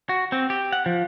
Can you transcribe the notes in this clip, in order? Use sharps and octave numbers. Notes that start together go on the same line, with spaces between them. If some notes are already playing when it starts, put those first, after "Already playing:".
F#4
C4
G4
F#5
F3